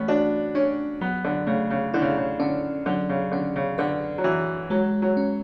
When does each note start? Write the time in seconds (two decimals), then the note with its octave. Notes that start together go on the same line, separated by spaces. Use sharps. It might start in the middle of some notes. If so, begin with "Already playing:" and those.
Already playing: E3 A3 B3 C#4
0.08 D4 F#4
0.55 C#4 D4
1.01 F#3 B3
1.24 D3
1.47 C#3 A3
1.70 C#3
1.94 D3 E4
2.02 C#3
2.17 C#3
2.39 D3 C#4
2.86 D3 F#3
3.09 C#3
3.31 D3 C#4
3.56 C#3
3.78 D3 B4
4.18 F#3
4.24 E3 F#4
4.70 F#3 G#3
5.02 F#3
5.17 C#4